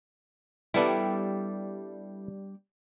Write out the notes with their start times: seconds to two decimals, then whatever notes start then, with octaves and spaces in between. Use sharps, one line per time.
0.74 G3 B3 D4 E4 A4 B4